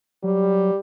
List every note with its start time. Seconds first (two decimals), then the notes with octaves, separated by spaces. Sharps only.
0.24 F#3 G3